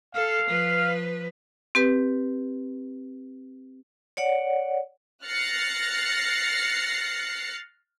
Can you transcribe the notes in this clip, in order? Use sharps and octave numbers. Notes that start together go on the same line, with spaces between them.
A4 F5
F3 B4
C4 G4 B4
C#5 D5 F#5
F6 F#6 A6 A#6 C7 C#7